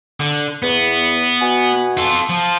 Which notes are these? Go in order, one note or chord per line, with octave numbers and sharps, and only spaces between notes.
D3
E2 B3
B2 F#4 G#5
F4 A4
F3